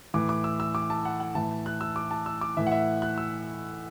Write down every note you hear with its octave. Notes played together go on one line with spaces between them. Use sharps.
A2 E3 D6
D6
E6
E6
D6
A5
F#5
F#5
A2 E3 A5
F#6
E6
D6
A5
E6
D6
A2 E3 E5
F#5
E5
F#6
E6